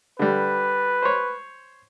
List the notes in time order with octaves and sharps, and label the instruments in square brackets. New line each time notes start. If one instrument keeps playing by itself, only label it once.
[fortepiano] D3 G3 [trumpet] B4
[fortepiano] C5 C#5